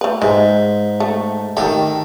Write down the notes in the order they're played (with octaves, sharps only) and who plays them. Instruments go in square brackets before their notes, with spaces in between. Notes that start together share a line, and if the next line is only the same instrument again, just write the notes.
[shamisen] A3 B4
[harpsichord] G#2 [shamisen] G#3
[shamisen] A3
[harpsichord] D#3 A4 [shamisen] A3 G4